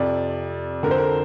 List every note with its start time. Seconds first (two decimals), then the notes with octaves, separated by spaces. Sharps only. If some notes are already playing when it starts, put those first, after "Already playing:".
Already playing: F2 C3 D5
0.83 D3 A#4
0.88 F2 C5
0.98 A#4